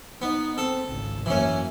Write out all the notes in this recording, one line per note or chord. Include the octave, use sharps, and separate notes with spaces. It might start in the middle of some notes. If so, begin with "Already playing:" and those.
B3 D#4
C4 A4
G#1 C#2
F#2 E3 A#3 C#4